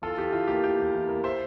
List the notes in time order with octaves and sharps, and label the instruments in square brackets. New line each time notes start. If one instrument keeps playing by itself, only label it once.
[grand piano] E2 F4 A4
E2 G4
E3 F4
A#3 G4
E2 G4
E2
E3
A#3
C5 E5